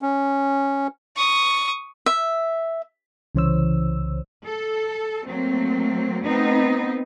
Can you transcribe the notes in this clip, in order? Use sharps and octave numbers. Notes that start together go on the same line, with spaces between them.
C#4
C#6 D#6
E5
C2 C#3 E3 C5 C#5 E6
A4
F#3 A3 A#3 C4
A3 B3 C4 D#4